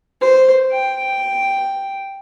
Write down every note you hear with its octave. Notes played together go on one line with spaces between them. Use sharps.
C5
G5